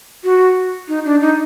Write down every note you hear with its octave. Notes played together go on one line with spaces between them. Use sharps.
F#4
D#4
D4
D#4